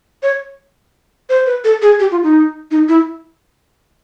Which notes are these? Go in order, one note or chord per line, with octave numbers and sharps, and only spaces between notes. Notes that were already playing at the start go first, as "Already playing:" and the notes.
C#5
C5
B4
A4
G#4
G4
F4
D#4
D#4
E4